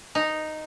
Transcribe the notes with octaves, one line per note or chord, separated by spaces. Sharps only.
D#4